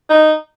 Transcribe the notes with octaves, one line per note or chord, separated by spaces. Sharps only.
D#4